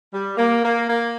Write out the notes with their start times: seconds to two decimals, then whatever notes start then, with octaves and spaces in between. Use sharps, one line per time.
0.13 G3
0.38 A#3
0.63 A#3
0.88 A#3